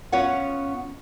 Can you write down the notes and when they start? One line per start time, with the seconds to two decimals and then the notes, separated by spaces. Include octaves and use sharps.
0.12 B3 C#4 F4 C#5 F#5